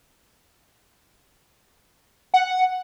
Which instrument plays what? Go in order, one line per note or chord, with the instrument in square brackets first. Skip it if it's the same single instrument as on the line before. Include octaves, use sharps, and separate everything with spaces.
[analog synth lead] F#5